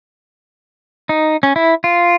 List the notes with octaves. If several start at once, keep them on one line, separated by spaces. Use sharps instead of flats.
D#4
C#4
E4
F4